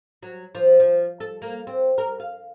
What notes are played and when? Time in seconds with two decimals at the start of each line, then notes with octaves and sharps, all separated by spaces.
0.23 F#3
0.55 F3
0.80 F3
1.20 A4
1.42 A#3
1.67 C4
1.98 A#4
2.20 F5